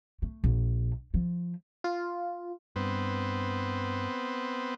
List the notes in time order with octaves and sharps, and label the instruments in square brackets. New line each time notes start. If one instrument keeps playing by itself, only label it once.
[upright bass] A3
A#1
F3
[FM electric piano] F4
[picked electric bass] G2 [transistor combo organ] B3 C4